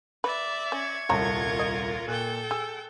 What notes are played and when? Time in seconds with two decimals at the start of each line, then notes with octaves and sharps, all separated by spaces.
0.24 B4 D5 E5
0.72 C#4 C#6 G#6
1.09 D#1 C2 C#3 F4 A#4 C#5 A5 A#5
1.59 D#5
2.08 A#2 A4 G5 F#6
2.51 G#4 E6